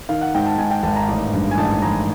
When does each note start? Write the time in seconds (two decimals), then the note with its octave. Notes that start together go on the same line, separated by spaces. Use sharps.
0.09 D#3 F5
0.21 F#5
0.35 G#2 G5
0.46 A5
0.58 G#2 G#5
0.71 G5
0.83 G#1 A5
0.96 A#5
1.09 A1
1.33 G2
1.51 G#5
1.58 A1 A5
1.82 A1 A#5